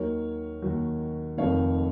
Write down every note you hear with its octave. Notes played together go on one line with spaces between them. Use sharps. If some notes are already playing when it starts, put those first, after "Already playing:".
Already playing: D#2 D#3 F#3 A#4 C#5
D#2 D#3 F#3
F1 F2 D#3 F#3 C#5 F5